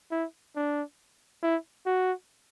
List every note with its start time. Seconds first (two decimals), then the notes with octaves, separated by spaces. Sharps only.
0.12 E4
0.56 D4
1.43 E4
1.86 F#4